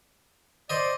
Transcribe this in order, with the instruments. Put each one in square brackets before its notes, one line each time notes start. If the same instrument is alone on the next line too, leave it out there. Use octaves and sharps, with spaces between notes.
[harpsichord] C5 D#5 [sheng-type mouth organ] D5